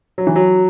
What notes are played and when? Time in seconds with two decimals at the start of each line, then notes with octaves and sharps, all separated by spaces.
0.18 F#3
0.27 E3
0.36 F#3